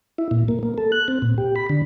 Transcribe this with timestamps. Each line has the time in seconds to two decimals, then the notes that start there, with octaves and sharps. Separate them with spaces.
0.18 E4
0.31 A#2
0.48 A#3
0.63 A#3
0.78 A4
0.92 F#6
1.08 C4
1.22 A#2
1.38 G4
1.56 B5
1.70 D3